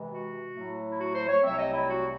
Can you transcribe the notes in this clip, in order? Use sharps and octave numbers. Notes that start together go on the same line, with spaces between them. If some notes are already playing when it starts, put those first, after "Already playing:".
Already playing: C3 E3 G#3
F#4
A2 F#3 A3
E4
F#4
C5
C#5
C2 C3 F#3 A3 C4 E5
C#5
D#5
E4
F#4